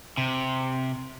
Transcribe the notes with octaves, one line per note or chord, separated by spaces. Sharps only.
C3